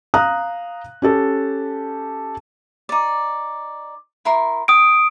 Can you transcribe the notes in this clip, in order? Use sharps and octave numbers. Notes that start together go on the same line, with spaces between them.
F5 A#5 D#6 F#6
C#4 G4 A4
D#4 D5
E4 A#4 C6
G5 D#6 D7